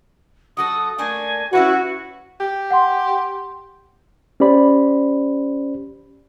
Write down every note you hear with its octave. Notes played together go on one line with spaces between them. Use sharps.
F#3 F#4 A4 D#6
A3 A#3 D4 G#5
C#4 E4 F#4 B4 C#7
G4
F#5 C6
C#4 G4 C5 D5 B5